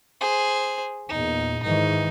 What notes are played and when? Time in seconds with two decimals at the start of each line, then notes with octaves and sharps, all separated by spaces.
0.21 G#4 C5
1.09 E2 A#2 D#4
1.63 G#2 D#3 E3 D#4